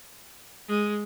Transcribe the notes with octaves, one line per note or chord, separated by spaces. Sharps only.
G#3